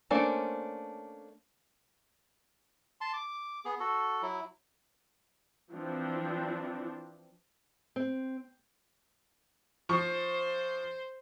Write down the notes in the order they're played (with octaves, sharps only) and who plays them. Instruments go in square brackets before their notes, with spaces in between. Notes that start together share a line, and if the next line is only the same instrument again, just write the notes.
[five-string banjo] A3 A#3 C#4 D4 C5
[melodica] A5 C6
D6
B3 G#4
F#4 A4
F#3 E4
[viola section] E3 F3 C4 D4
[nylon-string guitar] C4
[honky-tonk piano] F3 C#6 [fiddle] C5